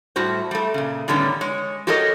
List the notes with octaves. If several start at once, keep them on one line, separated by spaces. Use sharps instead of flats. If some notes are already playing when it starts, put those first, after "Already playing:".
A2 G3 F#4 C5
G3 A3
A#2 C#3
A2 D3 D#3 G3 B3 C#4
G#3 C#5
F#4 G4 A4 A#4 C#5 D#5